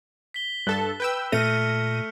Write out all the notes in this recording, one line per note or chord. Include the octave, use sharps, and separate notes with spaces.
B6 G7
G2 A4 A5 F#6
B4 G5 E6
A#2 A3 F6 A#6 C#7 D#7 F7